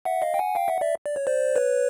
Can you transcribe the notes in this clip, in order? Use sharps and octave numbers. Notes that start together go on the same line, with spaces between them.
E5 F#5
D#5 F5
G5
F#5 G#5
F5 G5
E5 F#5
D5 E5
D5
C#5
C5 D5
B4 C#5